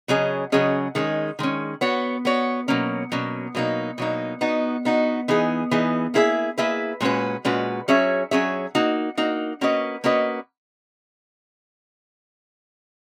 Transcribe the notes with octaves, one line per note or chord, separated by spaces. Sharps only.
C#3 F#3 C#4 G#4 D#5
C#3 F#3 C#4 G#4 D#5
D#3 G#3 C#4
D#3 G#3 C#4
B3 F#4 C#5
B3 F#4 C#5
B2 F#3 A#3 C#4
B2 F#3 A#3 C#4
B2 F#3 A#3 D#4
B2 F#3 A#3 D#4
B3 D#4 F#4
B3 D#4 F#4
E3 B3 D#4 G#4
E3 B3 D#4 G#4
A#3 E4 G#4 B4 E5
A#3 E4 G#4 B4 E5
A#2 G#3 C#4 F#4 B4
A#2 G#3 C#4 F#4 B4
F#3 C#4 G#4 C#5 E5
F#3 C#4 G#4 C#5 E5
A#3 D#4 F#4
A#3 D#4 F#4
A#3 C#4 F#4 B4 D#5
A#3 C#4 F#4 B4 D#5